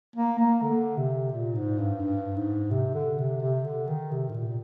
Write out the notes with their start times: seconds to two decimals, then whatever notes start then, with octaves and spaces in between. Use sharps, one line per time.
0.16 A#3
0.39 A#3
0.62 D3
0.97 C3
1.32 A#2
1.55 G#2
1.79 G2
2.02 G2
2.36 G#2
2.71 C3
2.95 D3
3.18 C3
3.41 C3
3.64 D3
3.87 D#3
4.11 C3
4.29 G#2
4.34 A#2
4.47 A#2